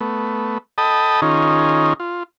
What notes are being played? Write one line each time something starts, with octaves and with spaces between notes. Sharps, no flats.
A3 B3
A4 D#5 G5 A5 B5 D#6
D#3 C#4 D#4 F4 G#4
F4